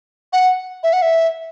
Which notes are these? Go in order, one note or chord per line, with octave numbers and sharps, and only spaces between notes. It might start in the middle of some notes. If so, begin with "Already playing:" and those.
F#5
E5
F#5
E5